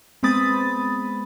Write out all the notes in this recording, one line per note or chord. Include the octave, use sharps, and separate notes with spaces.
G#3 B3 C4 B5 D#6 A6